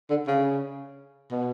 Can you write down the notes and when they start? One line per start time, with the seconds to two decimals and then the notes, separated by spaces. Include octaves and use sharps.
0.10 D3
0.27 C#3
1.31 B2